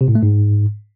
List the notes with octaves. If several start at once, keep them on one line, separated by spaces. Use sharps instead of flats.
C3
A2
A3
G#2